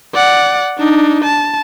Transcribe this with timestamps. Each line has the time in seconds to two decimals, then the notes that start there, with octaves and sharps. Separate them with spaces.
0.14 D5 F#5
0.79 D4 D#4
1.25 A5